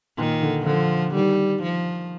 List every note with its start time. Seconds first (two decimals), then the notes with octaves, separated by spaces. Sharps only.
0.18 A#2 D#3
0.42 D3
0.66 D3 F3
1.15 D#3 G3
1.63 F3